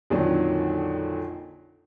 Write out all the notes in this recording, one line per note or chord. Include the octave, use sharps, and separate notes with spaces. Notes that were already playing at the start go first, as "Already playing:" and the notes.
A#1 F2 D3 D#3 F#3